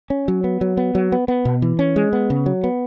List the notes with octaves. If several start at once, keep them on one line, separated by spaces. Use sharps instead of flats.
C#4
F#3
B3
F#3
B3
F#3
B3
B3
B2
E3
C#4
G#3
B3
C#3
F#3
B3